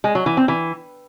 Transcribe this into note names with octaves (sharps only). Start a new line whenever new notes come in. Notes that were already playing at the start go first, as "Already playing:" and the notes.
G#3
F#3
E3
C4
E3